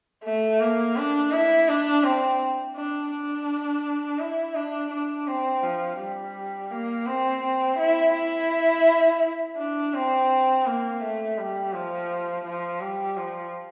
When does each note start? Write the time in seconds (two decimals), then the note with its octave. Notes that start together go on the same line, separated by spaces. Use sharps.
0.25 A3
0.60 A#3
0.96 D4
1.32 E4
1.68 D4
2.03 C4
2.75 D4
3.12 D4
4.19 E4
4.55 D4
4.90 D4
5.27 C4
5.63 F3
5.99 G3
6.71 A#3
7.06 C4
7.43 C4
7.79 E4
8.14 E4
9.57 D4
9.94 C4
10.66 A#3
11.02 A3
11.38 G3
11.73 F3
12.46 F3
12.81 G3
13.17 F3